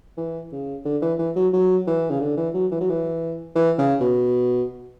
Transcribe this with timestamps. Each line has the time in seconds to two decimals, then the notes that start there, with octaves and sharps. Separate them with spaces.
0.18 E3
0.52 C#3
0.85 D3
1.02 E3
1.19 E3
1.36 F#3
1.53 F#3
1.87 E3
2.10 C#3
2.20 D3
2.37 E3
2.54 F#3
2.71 E3
2.81 F#3
2.90 E3
3.56 E3
3.78 C#3
4.01 B2